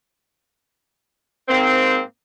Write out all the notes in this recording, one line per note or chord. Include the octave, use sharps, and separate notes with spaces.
G#2 A#3 C4